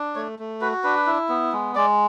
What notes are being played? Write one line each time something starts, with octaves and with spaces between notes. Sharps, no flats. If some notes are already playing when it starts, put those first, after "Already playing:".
Already playing: D4
A3 C#5
A3
F#4 B4
D4 B4
E4
B3
G#3
G#3 D5